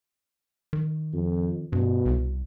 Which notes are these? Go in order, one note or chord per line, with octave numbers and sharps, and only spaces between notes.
D#3
F2
G2 B2
C2